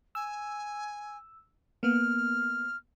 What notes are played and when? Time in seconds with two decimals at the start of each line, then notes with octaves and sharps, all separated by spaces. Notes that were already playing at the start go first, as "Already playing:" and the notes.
0.15 G#5 E6
1.83 A#3 B3 F6